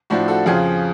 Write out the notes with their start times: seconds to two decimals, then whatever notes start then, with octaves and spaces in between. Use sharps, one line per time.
0.10 A2 F3 D4 F#4
0.28 F#4 A4
0.46 F2 C#3 F3 F4 G#4